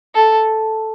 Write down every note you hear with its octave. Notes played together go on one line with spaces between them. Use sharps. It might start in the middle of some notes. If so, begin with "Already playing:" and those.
A4